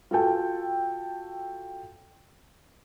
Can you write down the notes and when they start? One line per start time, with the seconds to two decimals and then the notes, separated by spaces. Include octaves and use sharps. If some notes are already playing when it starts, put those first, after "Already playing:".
0.11 F4 F#4 A4 G5